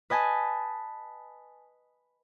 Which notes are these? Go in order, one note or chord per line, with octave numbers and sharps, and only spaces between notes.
B4 D#5 G#5 A5